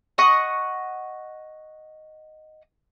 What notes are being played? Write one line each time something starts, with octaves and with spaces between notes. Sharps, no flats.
D#5 F#5 C#6 D#6